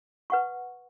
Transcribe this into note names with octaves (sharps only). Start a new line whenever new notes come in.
B4 F#5 C#6